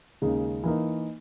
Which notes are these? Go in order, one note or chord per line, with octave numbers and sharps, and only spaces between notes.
D#2 C#3 G#3 D#4
E3 A#3 D#4